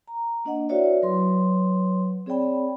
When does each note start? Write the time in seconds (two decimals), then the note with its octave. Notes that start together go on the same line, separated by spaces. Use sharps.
0.08 A#5
0.45 A#3 D4 D#5 F#5
0.69 E4 F#4 B4 C#5 D5 E5
1.03 F#3 B4 C#5 C6
2.26 C4 G#4 C#5 D5 G5 B5